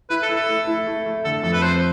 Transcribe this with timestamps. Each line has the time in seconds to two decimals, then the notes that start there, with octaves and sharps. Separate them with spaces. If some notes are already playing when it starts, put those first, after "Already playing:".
0.10 E4 B4
0.23 A4
0.29 E4
0.35 A4
0.49 A3
0.67 E4
0.87 A3
1.06 A3
1.25 D3 A4
1.43 F2 A4
1.53 B4
1.62 C4 C5